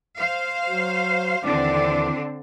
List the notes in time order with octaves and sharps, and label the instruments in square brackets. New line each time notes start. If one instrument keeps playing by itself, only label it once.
[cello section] C5 F5
[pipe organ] F#3
[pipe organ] D#2 E3 D5 [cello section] D3 C4 D4